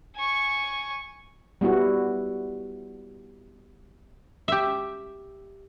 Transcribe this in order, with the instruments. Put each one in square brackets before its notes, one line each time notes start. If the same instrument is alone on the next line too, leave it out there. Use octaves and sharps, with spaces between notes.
[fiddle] G#5 C#6
[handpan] G3 B3 E4 F#4
[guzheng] G4 E5